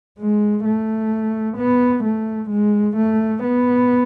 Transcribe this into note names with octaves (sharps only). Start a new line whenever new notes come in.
G#3
A3
B3
A3
G#3
A3
B3